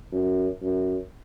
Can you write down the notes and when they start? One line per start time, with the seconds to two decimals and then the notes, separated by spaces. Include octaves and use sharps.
0.12 F#2
0.62 F#2